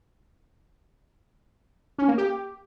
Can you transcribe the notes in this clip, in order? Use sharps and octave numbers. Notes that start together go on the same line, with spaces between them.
C#4
A#3
G4